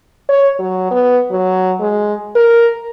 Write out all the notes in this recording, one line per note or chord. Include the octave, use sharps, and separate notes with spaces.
C#5
F#3
B3
F#3
G#3
A#4